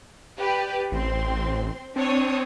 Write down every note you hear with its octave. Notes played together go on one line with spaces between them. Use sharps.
G4 B4 D5
A1 C4 C6
C4 D4 C#5 D#6